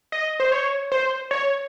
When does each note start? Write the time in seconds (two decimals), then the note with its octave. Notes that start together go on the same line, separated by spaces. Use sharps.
0.12 D#5
0.40 C5
0.52 C#5
0.92 C5
1.31 C#5